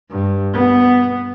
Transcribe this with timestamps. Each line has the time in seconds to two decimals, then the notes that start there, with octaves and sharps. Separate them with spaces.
0.11 G2
0.54 B3